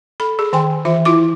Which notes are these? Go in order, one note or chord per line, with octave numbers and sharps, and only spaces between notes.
A4 B5
G#4
D#3 G5 G#5 C6
E3 F4 E5
E4 F4 D6